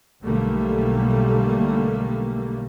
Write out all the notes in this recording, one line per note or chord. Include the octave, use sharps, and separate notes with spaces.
B1 D3 G3 A3 A#3